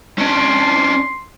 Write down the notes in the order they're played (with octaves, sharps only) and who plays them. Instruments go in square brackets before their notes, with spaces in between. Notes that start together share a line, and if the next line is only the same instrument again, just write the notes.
[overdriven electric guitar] C#4 D4 [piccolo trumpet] C6